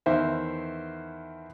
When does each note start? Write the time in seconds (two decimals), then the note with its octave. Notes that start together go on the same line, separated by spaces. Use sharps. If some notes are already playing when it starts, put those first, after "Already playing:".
0.06 E2 D#3 C5 E5